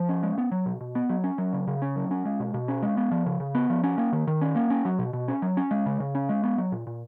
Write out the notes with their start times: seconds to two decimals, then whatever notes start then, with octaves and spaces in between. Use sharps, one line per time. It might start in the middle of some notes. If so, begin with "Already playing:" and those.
Already playing: F3
0.09 C#4
0.23 G#3
0.38 B3
0.52 F#3
0.66 B2
0.81 B2
0.95 B3
1.10 F#3
1.24 C#4
1.38 F#3
1.53 C#3
1.67 C#3
1.82 C#4
1.96 F#3
2.11 C#4
2.25 G#3
2.40 B2
2.54 B2
2.68 C#4
2.82 G#3
2.97 B3
3.11 F3
3.26 C#3
3.40 C#3
3.55 B3
3.70 F3
3.84 C#4
3.98 A#3
4.12 D#3
4.27 D#3
4.42 C#4
4.55 A#3
4.70 C#4
4.85 F#3
4.99 B2
5.13 B2
5.28 C#4
5.42 F#3
5.57 C#4
5.71 G#3
5.86 C#3
6.00 C#3
6.15 C#4
6.29 G#3
6.44 B3
6.58 F#3
6.72 A#2
6.87 A#2